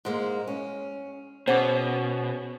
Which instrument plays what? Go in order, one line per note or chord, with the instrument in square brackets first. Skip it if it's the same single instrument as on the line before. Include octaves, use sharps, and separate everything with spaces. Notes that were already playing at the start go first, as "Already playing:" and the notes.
[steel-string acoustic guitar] G#2 G#3 A#3
C#4
[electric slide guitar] B2 [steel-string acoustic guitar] C#4 G#4 [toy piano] C5 F#5 D6